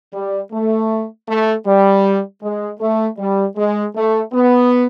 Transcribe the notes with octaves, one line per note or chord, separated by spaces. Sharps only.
G3
A3
A3
G3
G#3
A3
G3
G#3
A3
B3